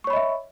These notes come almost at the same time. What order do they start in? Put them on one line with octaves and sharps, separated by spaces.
C#6 C#5 B5 D#5 E5